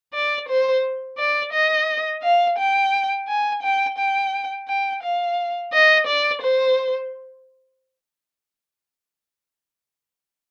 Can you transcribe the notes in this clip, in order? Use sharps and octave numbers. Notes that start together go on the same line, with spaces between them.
D5
C5
D5
D#5
F5
G5
G#5
G5
G5
G5
F5
D#5
D5
C5